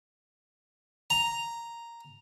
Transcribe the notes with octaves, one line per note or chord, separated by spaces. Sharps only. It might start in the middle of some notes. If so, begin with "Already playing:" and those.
A#5